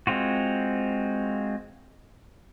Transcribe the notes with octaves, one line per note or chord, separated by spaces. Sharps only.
G#3 C4 F4 F#4